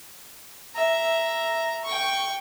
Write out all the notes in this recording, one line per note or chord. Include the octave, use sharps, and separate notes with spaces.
E5 A#5
G5 C#6